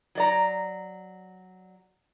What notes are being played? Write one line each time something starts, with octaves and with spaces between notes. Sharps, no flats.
F#3 D5 A#5